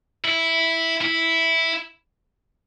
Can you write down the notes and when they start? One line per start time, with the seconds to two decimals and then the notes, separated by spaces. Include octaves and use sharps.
0.25 E4
1.01 E4